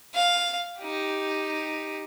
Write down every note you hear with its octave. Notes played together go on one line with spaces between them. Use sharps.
F5
D#4 G4